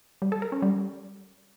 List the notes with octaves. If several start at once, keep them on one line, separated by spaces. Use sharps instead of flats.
G3
A4
A#4
C#4
G3